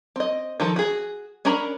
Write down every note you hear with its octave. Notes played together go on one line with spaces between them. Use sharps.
C4 D#5
D#3 F3 A4
F#4 G#4
C#4 D4 A#4 A#5 B5